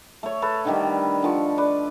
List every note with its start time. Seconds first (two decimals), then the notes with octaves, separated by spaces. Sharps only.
0.23 A3 C#5
0.42 A4 B4
0.65 D3 D#3 G3
1.23 D3 F3 C#6
1.58 B4 D5